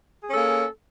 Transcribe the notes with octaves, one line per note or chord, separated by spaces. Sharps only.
A#3 C#4 G#4 A4